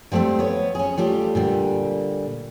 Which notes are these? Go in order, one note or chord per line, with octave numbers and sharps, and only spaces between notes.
F3 G3 A3 A#3 C4
B3 C#5
C#4 G#4
G3 A3 F4 G4
A#2 D3 G3